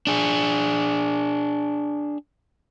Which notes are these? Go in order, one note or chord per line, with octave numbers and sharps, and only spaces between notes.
D4 G#4